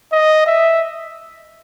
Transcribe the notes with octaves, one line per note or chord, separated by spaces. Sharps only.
D#5
E5